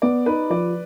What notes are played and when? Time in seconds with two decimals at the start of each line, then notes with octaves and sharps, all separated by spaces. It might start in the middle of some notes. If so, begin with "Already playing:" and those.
0.02 B3 D5
0.26 D#4 B4
0.50 F3 D5